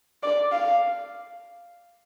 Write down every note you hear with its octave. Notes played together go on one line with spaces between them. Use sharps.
D5
F5